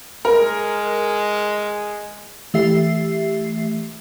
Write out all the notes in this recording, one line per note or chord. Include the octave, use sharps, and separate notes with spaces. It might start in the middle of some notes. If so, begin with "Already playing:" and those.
G#3 A#4
E3 A3 G4 E5 C7